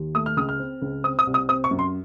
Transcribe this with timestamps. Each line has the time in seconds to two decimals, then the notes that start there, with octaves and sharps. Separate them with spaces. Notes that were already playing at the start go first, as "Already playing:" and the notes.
Already playing: D#2
0.15 A3 D#6
0.26 F6
0.37 C#2 D#6
0.49 F6
0.60 C4
0.82 C#2
1.04 C4 D#6
1.19 D#6
1.27 C2
1.34 D#6
1.49 C4 D#6
1.64 C#6
1.71 F#2
1.79 C6